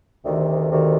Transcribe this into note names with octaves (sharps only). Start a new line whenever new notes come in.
D2 C3 D#3
D2 C3 D#3